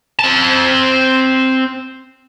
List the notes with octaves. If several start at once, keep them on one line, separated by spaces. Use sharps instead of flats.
C4 A5